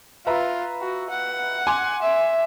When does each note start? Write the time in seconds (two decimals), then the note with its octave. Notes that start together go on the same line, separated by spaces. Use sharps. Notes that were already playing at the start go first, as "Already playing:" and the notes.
0.27 F4 B4 E5 A#5
0.81 F#4
1.10 F#5
1.67 G#5 C6 D6
2.02 E5